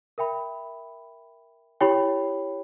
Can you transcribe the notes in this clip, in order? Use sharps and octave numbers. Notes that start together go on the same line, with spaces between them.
A#4 E5 G5 B5
E4 G4 C#5 G5 B5